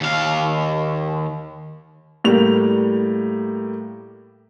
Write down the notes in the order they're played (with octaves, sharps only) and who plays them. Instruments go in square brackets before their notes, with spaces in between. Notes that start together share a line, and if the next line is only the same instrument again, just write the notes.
[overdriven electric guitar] D#2 F5
[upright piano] A2 G3 A#3 F7